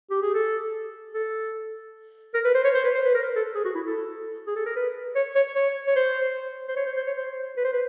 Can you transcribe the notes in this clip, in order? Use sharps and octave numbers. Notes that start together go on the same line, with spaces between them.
G4
G#4
A4
A4
A#4
B4
C5
C#5
C5
B4
C5
B4
A#4
A4
G#4
F#4
E4
A4
G#4
A4
A#4
B4
C#5
C#5
C#5
C#5
C5
C5
C#5
C5
C5
C#5
C5
B4
C5
B4